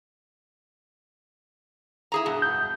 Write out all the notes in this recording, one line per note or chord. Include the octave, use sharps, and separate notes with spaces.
E4 G#4 A#5
G2 B2
G6